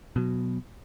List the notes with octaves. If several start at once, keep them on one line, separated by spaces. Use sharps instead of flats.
B2 F#3